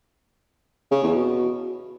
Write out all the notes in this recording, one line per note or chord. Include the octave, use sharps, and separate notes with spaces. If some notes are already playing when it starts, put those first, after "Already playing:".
C#3
E2
B2